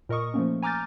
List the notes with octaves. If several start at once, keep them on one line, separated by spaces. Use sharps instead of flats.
A#2 A#4 D#5 C#6 D#6
F3 A3 A#3 C#4
G#5 A#5 D6 F6 G6 A6